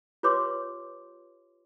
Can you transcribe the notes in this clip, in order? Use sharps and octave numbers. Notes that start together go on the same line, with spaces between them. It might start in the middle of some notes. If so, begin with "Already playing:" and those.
F4 G4 B4 C#5 C6 D6